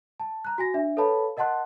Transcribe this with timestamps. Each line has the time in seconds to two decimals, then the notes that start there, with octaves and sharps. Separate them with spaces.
0.20 A5
0.45 A#5 F#6
0.58 F#4 G#5 A#6
0.74 D4 E5
0.97 A4 B4 C#5 F5 A5 B5
1.37 A#4 D#5 F#5 A5 C6 F#6